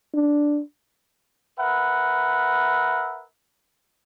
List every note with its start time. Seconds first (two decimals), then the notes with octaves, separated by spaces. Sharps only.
0.14 D4
1.59 A#4 B4 E5 F#5